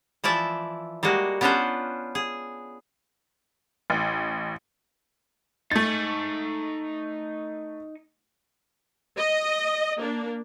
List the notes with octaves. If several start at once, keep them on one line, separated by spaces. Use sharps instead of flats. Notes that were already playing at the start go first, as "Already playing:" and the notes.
E3 F3 E4 D5 E5
G3 G#3 A#3 F#4
B3 C#4 D4 F4 B4 C5
G#4
A1
A3 D#4 G#5 A6
D#5
A#3 D4